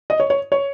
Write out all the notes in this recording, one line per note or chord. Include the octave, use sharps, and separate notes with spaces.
D#5
C#5
C#5
C#5